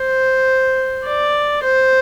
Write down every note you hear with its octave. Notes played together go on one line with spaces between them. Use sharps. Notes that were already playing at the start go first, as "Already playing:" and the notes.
Already playing: C5
D5
C5